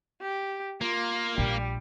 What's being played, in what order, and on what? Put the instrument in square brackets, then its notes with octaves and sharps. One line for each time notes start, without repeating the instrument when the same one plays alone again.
[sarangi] G4
[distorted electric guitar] A#3 [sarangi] F4
[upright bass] A#1 [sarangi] G3